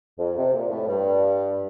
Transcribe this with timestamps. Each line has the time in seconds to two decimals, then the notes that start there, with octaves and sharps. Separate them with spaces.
0.19 F2
0.37 C3
0.53 A#2
0.71 A2
0.88 G2